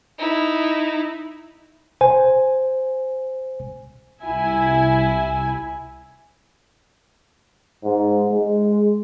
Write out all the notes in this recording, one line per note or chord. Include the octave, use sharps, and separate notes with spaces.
D#4 E4
C5 G#5
C2 E4 E5 G#5
G#2
G#3